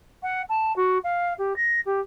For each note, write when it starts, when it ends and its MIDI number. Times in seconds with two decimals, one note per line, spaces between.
0.23 0.42 78
0.49 0.75 81
0.76 0.98 66
1.04 1.34 77
1.38 1.56 67
1.56 1.80 94
1.85 2.00 67